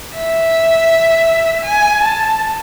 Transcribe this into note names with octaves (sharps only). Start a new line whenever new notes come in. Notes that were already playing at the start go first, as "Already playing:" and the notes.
E5
G#5
A5